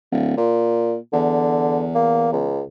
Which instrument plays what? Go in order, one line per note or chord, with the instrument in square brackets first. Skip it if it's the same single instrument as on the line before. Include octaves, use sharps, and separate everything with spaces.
[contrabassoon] D1
A#2
[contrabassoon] E2 [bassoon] D3
[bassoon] A#3
C#2